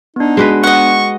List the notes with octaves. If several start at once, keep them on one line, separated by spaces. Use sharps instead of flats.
B3 D4 D#4
G#3 F#4 B4
D#5 F#5 C#6